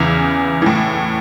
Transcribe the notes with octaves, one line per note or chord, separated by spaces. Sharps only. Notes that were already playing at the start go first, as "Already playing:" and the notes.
Already playing: E2 C#3 E3
A2 E3